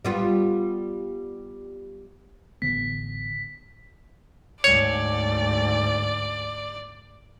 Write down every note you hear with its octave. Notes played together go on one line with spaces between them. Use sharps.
G3 B3 F4
A1 D3 B3 B6
D2 G#2 C#5 D5